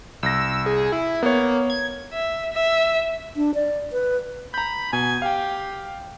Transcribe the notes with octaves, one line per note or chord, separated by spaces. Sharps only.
C2 E6 A#6
G#4
E4
A#3 B3 C#5
G#6
E5
E5
D4
D5
B4
A#5 B5 G6
B2 G#5
G4 F5 G5